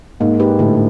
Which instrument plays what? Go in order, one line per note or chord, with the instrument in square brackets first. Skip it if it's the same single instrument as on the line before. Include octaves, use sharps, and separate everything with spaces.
[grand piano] G#2 [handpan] A#3
[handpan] D#4 G4 B4
[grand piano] A2 [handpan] D3